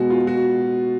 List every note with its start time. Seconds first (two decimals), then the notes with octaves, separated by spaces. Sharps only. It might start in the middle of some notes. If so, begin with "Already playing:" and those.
Already playing: B2 G#3 F#4
0.10 F4
0.27 F#4